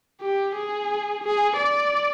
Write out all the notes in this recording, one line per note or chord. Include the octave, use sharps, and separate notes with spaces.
G4
G#4
G#4
D5